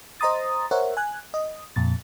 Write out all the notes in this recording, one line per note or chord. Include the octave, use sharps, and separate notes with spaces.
C5 D#5 A#5 C6 D#6 A6
A#4 C5 C#5 E5 F#5
G#5 F#6
D#5
F2 A#2 A6